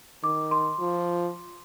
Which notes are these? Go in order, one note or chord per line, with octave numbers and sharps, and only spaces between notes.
D#3 D6
C6
F3